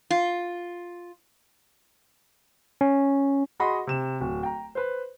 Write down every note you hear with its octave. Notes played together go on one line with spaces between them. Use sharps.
F4
C#4
F#4 G#4 D#5 F#5 B5 C6
C3 E7
D1
G5 A#5
B4 C5